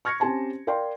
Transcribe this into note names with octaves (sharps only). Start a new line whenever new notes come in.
C#6 F6 G#6 A#6 C#7
C4 C#4 G4 G#5 A5 C6
A#4 D5 F5 G5 C6